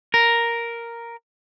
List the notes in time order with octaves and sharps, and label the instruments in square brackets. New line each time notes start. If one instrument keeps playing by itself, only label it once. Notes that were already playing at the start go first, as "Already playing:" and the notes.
[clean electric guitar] A#4